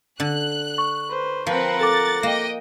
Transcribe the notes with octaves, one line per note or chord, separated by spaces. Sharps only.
D3 F#6
C#6
B4 C5
F3 C4 A#4 B4 F#5
A4 D6 A6
A#3 D#5 G5 A#6